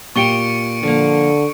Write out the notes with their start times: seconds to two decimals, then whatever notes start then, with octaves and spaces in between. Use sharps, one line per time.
0.16 A#2 F4 G4 C#6 C#7 D7 G7
0.83 D3 F3 A#3